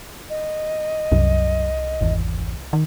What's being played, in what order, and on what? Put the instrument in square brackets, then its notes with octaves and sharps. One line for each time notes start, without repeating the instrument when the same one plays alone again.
[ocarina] D#5
[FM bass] C2 [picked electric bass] F#2
[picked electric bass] G#1 E2
[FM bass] D#3